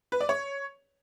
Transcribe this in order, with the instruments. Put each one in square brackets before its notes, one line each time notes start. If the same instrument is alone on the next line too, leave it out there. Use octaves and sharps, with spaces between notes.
[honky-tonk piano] B4
D5
C#5